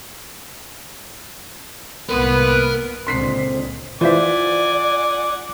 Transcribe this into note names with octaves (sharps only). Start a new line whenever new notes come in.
C2 G#2 A#3 B3 A#4 B4 C6
C#2 A#2 D3 G#3 C4 C6 B6 C7
E3 F4 C5 D5 E5 F#5 G#5 D6